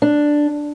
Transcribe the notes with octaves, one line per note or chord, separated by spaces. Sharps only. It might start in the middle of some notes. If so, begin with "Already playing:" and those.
D4